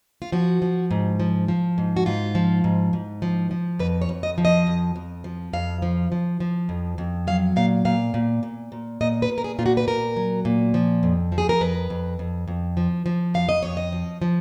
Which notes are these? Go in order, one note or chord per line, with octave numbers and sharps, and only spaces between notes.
F4
F3 F#4
F3
G#2
F3
F3
G#2
F#4
G#2 F4
F3
G#2
G#2
F3
F3
F2 B4
C#5
F2
D#5
F3
D#5
F2
F2
F3
F2 F5
F3
F3
F3
F2
F2
F#3 F5
A#2 F5
A#2 F5
A#2
A#2
A#2
A#2 D#5
B4
A#2
A#4
G#4
A#2 F4
F#4
B4
A#2 A#4
F#3
A#2
F3
F2
F3
G#4
A#4
F2 B4
F2
F2
F2
F3
F3
F2 F5
D#5
F2 C#5
D#5
F3
F3